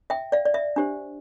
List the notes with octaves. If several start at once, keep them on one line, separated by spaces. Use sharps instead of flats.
E5 G5
D5 F5
D5
E5
D4 G4 C5